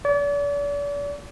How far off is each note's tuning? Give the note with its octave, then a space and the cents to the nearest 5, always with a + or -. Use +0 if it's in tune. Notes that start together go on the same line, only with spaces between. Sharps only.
D5 -40